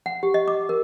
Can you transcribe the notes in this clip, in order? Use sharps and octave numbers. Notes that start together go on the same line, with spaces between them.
F#5
G4
D#5
D6
A#4